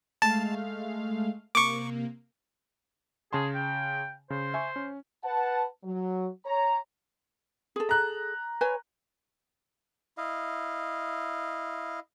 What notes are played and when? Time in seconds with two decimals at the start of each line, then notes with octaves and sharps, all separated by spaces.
0.22 G#3 A3 F5 A5
1.55 C3 A#3 C#6 D6
3.33 C#3 G#4 A5 C6
3.54 G5
4.30 C#3 C5
4.54 E5 G#5 C#6
4.76 C#4
5.24 B4 F#5 A5
5.84 F#3
6.45 C#5 A#5
7.76 G#4 A4
7.89 A#5 F#6
8.61 B4 C#5 G#5
10.18 E4 D#5 F5